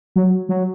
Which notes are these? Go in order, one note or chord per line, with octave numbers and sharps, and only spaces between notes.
F#3
F#3